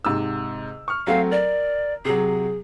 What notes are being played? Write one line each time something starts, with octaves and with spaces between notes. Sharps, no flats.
G#2 C3 E6
C#6 F6
F#3 A3 C4 F5
A#4 D5
C3 F#3 G#4